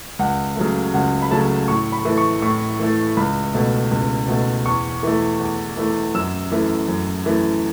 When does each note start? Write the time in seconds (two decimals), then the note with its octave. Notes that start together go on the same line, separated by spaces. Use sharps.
0.19 C#2 F#5
0.56 C#3 F#3 A3
0.94 C#2 F#5
1.22 B5
1.31 C#3 F#3 A3 A5
1.68 A2 C#6
1.92 B5
2.05 E3 A3
2.18 C#6
2.42 A2 C#6
2.79 E3 A3
3.17 C#2 B5
3.54 B2 A3
3.91 C#2
4.28 B2 A3
4.66 E2 C#6
5.03 E3 A3
5.39 E2
5.77 E3 A3
6.14 F#2 E6
6.52 E3 A3
6.88 F#2
7.26 E3 A3